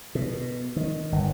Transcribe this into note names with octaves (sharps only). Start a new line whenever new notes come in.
B2
D#3
G1